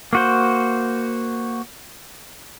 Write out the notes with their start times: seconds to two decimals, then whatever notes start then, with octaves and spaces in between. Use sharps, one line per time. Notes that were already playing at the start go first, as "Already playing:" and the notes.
0.13 A#3 F#4 C5